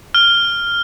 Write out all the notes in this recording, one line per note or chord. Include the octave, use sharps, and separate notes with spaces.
F6